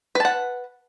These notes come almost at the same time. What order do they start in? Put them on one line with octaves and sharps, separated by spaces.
B4 A5 F#5